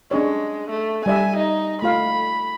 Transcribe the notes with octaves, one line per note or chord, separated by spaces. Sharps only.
G#3 C#4 D4 C#5
A3
G3 D5 E5 G#5
D#4
A3 F4 F5 B5